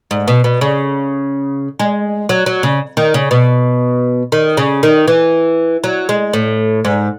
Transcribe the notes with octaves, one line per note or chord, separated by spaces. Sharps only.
G#2
B2
B2
C#3
G#3
F#3
F#3
C#3
D#3
C#3
B2
D#3
C#3
D#3
E3
F#3
G#3
A2
G#2